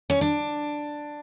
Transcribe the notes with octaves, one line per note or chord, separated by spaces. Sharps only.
C#4
D4